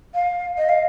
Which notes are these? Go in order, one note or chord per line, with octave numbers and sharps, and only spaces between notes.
F5
D#5
F5